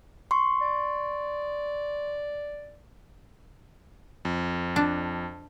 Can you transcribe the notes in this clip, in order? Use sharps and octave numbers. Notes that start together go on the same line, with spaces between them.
C6 C#6
D5
F2
D4